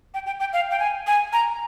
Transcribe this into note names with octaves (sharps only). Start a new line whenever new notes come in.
G5
G5
G5
F5
G5
G#5
G#5
A#5